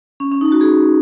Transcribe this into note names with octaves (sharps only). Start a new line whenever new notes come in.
C#4
C#4
D#4
F#4
G#4